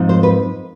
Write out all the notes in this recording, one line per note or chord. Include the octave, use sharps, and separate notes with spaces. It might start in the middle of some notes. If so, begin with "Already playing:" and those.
Already playing: G#2 F3 C4 D#4
C5
B4